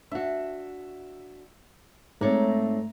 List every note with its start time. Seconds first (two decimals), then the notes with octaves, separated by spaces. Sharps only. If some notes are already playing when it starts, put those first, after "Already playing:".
0.11 D4 F#4 E5
2.21 G#2 A3 C4 C#5 D5 A#5